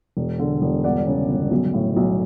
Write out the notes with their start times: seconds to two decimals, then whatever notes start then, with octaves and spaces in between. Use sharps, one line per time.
0.17 E1
0.39 D3
0.62 E1
0.84 G1 D5 F#5
1.06 C#3
1.29 G1
1.51 B1
1.74 A2
1.97 B1